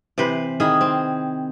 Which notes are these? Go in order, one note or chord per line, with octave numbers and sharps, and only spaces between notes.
C3 E3 B4 C5
D#3 E4 G#4
C4